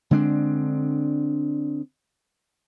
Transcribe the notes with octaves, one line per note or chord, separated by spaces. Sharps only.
D3 G#3 C4 D4